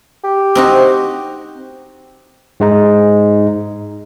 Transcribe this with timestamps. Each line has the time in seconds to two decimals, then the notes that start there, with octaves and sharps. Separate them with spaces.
0.24 G4
0.55 C4 D#4 F#4
2.60 G#2 G#3 D#4